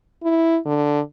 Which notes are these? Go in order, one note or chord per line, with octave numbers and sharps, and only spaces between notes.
E4
D3